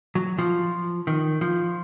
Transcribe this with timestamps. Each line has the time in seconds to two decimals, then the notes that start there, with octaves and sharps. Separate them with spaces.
0.15 F#3
0.39 F3
1.07 D#3
1.41 F3